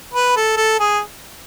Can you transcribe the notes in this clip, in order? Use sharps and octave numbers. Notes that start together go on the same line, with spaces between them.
B4
A4
A4
G#4